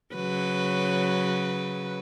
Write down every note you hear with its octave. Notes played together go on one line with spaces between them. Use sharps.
C#3 F#3 B4